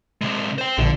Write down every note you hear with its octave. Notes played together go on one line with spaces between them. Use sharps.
C3 G#3
C5 G5
A#1 D3